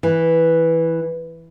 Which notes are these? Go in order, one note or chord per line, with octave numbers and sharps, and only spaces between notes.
E3